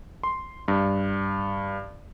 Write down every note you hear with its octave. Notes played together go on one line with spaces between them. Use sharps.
C6
G2